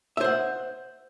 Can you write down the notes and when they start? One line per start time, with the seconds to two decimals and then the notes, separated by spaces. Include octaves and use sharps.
0.17 E5
0.21 C5
0.24 F#5